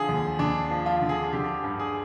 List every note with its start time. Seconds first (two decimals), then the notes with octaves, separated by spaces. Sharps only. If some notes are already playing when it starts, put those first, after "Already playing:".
Already playing: D3 F3 G#4
0.09 D#2
0.39 D#2 D4
0.71 F3
0.86 F4
1.01 D3
1.09 G#4
1.33 D3 G4
1.64 G2
1.79 G#4